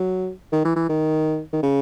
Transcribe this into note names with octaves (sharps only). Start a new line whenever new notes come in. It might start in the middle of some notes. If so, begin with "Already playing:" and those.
Already playing: F#3
D#3
E3
E3
D#3
D#3
C#3